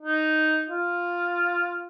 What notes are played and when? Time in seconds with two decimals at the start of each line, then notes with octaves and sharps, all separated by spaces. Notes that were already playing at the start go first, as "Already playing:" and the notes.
0.03 D#4
0.70 F4